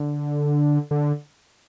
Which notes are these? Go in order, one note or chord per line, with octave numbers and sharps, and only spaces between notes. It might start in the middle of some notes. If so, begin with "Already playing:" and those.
Already playing: D3
D3